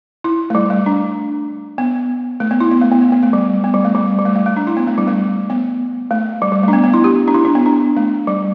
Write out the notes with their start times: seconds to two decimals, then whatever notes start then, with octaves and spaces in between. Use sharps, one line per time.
0.24 E4
0.50 A3
0.55 G3
0.70 A3
0.86 D4
1.78 B3
2.40 A3
2.51 B3
2.60 E4
2.71 B3
2.81 A3
2.92 B3
3.02 B3
3.12 B3
3.23 A3
3.33 G3
3.64 B3
3.74 G3
3.85 A3
3.95 G3
4.18 G3
4.25 A3
4.36 A3
4.46 A3
4.57 D4
4.67 E4
4.77 B3
4.87 A3
4.98 G3
5.08 A3
5.50 B3
6.11 A3
6.42 G3
6.52 G3
6.63 A3
6.68 D4
6.73 B3
6.84 B3
6.94 E4
7.04 G4
7.28 D4
7.34 E4
7.45 D4
7.55 B3
7.66 D4
7.97 A3
8.27 G3